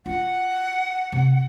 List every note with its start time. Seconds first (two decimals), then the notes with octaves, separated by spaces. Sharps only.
0.06 F4 F#5
1.12 C3